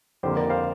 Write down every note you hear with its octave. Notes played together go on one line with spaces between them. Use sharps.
F2 D3 A#3 G4 C5
A#4 D5
C5 F5